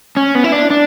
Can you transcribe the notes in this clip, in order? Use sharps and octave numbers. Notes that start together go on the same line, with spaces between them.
C#4
B3
E4
D4
D4